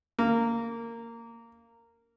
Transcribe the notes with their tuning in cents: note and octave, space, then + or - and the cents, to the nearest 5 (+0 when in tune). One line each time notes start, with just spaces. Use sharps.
A#3 -15